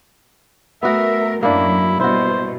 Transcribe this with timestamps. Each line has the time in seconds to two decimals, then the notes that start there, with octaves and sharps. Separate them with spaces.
0.83 A3 B3 F#4 A#4 E5
1.43 F#2 A2 F#3 A#3 D4 E4
2.00 G2 B2 E4 F#4 C5